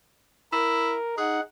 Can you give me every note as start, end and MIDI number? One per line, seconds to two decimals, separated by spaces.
0.52 0.95 64
0.52 1.15 70
1.18 1.40 63
1.18 1.41 68
1.18 1.40 78